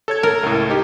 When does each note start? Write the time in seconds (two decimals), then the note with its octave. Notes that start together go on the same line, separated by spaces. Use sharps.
0.08 A4 C#5 G#6
0.23 A#4
0.43 C#2 A2
0.70 D#4 G4